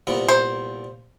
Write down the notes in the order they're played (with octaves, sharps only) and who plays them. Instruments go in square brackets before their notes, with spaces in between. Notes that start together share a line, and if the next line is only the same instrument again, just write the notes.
[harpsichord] C2 A#2 B3
[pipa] C5